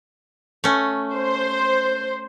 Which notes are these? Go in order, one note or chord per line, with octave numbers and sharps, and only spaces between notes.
A3 C#4
C5